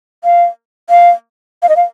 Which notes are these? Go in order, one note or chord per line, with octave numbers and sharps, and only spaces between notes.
F5
F5
F5
D#5
F5